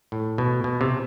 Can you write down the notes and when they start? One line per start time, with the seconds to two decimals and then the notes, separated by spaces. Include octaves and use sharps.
0.12 A2
0.38 B2
0.64 B2
0.81 C3